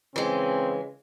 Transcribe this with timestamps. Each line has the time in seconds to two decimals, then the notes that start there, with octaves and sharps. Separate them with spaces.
0.16 C#3 E3 G#3 C4